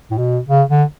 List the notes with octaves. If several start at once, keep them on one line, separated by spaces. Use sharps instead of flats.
A2
B2
C#3
D3